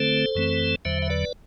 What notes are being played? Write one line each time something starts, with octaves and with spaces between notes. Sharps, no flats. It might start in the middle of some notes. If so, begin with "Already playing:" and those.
Already playing: D3 A3 C4 A4 C5
F#2 E3 A3 C4
E2 D3 F#3 C5 E5
E5
B4 D5